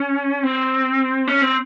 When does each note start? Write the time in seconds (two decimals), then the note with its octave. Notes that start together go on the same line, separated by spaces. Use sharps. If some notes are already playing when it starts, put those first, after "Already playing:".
Already playing: C#4
0.43 C4
1.28 C#4
1.41 C4